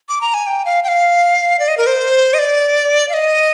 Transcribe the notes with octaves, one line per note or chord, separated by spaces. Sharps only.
D6
A#5
G#5
G5
F5
G5
F5
D5
D#5
A#4
C5
D#5
D5
F5
D#5